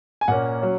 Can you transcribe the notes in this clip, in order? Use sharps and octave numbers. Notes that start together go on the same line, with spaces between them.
G#5
A#2 A#3 C#4 F#5
F#3 C#4